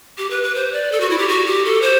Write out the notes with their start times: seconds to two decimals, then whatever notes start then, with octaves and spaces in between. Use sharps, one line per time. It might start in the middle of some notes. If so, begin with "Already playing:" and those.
0.18 G4
0.30 B4
0.43 B4
0.55 C5
0.73 D5
0.92 A4
1.00 F#4
1.10 E4
1.18 G4
1.28 F#4
1.46 G4
1.65 A4
1.82 C5